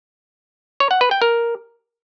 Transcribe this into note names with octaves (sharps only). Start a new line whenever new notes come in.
C#5
F#5
B4
G5
A#4